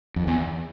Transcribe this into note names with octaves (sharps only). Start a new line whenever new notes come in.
F2
E2